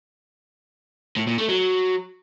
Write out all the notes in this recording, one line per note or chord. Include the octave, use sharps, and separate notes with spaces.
A2
A#2
A3
F#3